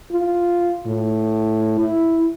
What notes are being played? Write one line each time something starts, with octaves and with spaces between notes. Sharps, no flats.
F4
A2
E4